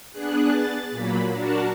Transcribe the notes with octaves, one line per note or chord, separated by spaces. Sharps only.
B3 D4 G#4 F#6
A6
A#2 F#3 A#3 B5
D4 F#4 A#4 A5